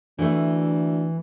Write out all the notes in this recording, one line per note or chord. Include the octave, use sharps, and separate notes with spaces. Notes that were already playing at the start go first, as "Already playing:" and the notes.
D2 E3 A3